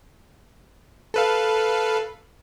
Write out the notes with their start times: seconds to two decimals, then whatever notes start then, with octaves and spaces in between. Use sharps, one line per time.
1.14 A4 B4 F5